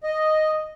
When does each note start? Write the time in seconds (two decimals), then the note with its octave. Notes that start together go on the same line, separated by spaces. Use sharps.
0.03 D#5